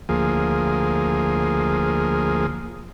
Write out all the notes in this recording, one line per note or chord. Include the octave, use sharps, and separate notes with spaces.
D2 F3 A#3 G#4